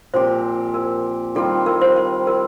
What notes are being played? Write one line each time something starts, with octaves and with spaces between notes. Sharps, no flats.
A#2 F3 C4 G4 C5
A#4
D#3 G3 C4 F4 A4
A#4
C5
A#4
A#4